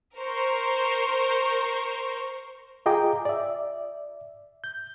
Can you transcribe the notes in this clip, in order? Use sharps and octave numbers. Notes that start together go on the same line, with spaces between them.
A#4 C5 C#6
F4 G#4 D#5 G5 A#5 D6
D5 E5
G6